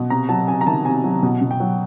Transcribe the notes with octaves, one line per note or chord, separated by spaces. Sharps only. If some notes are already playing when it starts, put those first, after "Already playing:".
Already playing: B2
C3 A#5
F#3 A5
C3 G#5
A#5
D#3 A5
C3 G#5
F#3
B2
B2
G5
F#3